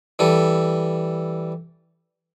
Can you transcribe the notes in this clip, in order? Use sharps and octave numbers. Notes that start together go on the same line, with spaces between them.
E3 G3 A4